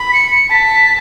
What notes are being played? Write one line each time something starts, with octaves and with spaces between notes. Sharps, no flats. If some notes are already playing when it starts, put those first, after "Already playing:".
Already playing: B5
B6
C#7
C#7
A5 B6